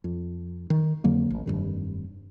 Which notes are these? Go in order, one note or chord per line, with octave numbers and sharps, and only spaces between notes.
F2
D#3
F2 D3 F#3 A#3
A1
F1 B1 G2 D#3